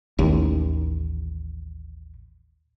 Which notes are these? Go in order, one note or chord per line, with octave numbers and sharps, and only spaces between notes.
A1 D#2